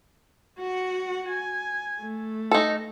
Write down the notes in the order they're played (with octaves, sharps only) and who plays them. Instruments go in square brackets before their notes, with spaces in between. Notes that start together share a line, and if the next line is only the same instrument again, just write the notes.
[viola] F#4 F#5
G#5
A3
[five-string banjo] D#4 A4